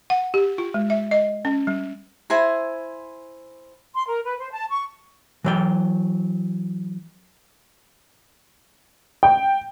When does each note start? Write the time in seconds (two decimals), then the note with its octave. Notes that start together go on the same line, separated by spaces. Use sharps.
0.10 F#5
0.34 G4
0.58 F4
0.74 G#3
0.90 E5
1.11 D#5
1.45 C#4
1.67 G3
2.30 E4 C5 G#5 A#5
3.94 C6
4.07 A#4
4.24 B4
4.38 C5
4.51 A5
4.69 C#6
5.44 E3 F#3 G5
9.23 G5